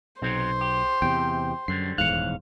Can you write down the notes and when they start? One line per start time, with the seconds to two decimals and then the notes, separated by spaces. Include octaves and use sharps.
0.22 B1 C3 F#3 C4 C5
0.61 G4
1.02 E2 C3 G5
1.68 F#2 D3 G3 C7
1.98 D#1 E2 G#2 C#5 F5 F#6